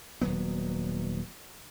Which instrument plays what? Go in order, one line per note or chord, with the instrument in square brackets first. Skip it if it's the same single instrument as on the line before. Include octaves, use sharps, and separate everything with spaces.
[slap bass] D#1 F#3 B3